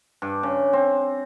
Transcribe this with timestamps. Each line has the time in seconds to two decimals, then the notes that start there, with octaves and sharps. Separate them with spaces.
0.22 G2
0.43 C#3
0.73 C4